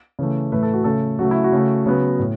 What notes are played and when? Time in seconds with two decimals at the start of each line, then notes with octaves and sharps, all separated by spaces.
0.19 C#3 E3 A3
0.52 A2 E3 A3 B4
0.63 A4
0.74 F#4
0.84 C#3 A3 A4
1.19 C#3 F#3 A3 F#4
1.31 E4
1.44 F#4
1.52 C#3 A3
1.86 C#3 F#3 B3
2.19 A2